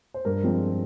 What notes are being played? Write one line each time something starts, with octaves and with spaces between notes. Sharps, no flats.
C5
G2 A#4
F3 G#3 C4